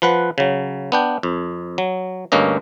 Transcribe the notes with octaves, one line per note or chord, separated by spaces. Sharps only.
F3 B4 F#5
C#3 F#3
B3 D4 G5
F2
F#3
D2 G2 A#3 C#4 D#5